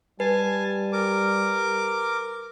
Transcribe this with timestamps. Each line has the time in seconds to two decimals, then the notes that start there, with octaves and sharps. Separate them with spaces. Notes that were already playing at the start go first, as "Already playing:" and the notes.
0.20 G3 B4 G#5 A5
0.93 A#4 D6